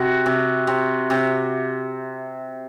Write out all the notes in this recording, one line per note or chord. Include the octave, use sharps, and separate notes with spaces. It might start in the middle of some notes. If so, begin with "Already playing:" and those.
Already playing: C3 F#4
C3
C3
C3